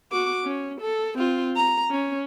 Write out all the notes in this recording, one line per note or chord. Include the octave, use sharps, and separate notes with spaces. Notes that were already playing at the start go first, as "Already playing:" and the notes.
F#4 D6
C#4
A4
C4 F4
A#5
C#4